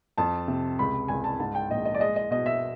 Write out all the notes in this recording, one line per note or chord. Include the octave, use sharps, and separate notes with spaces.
F2 A5
C3
C#2 B5
C#2 G#5
A5
G#2 A5
G5
A#1 D#5
D#5
D5
G#3 D#5
D#5
B2 D#5
E5